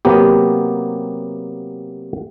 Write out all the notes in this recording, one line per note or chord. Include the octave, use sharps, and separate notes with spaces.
C3 F#3 A#3 B3 G4